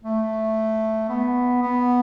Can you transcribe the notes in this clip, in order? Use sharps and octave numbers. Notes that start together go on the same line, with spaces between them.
A3
B3
B3